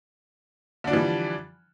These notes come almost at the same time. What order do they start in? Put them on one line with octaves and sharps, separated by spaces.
D3 D4 F3 E3 G3